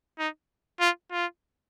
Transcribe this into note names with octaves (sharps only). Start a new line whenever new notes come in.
D#4
F4
F4